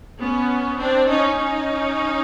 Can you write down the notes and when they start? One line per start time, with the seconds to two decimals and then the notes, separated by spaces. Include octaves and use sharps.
0.20 B3 C#4
0.79 C4 D4
1.07 C#4 D#4
1.37 C#4 D#4